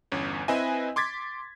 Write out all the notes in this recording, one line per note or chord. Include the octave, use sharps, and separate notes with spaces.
G1 E2 C#4
C4 E4 B4 D#5 E5 G#5
C6 D6 G#6 A6 B6